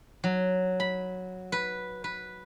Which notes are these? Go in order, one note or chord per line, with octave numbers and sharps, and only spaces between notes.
F#3
B5
B4
B4